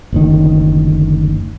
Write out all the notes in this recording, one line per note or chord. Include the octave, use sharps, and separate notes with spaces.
F#1 D2 D#3